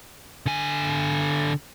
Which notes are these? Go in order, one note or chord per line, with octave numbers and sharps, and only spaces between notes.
D3 G#5